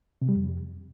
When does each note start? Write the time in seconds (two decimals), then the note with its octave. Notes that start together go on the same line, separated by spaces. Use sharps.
0.22 C3
0.29 G3
0.36 F2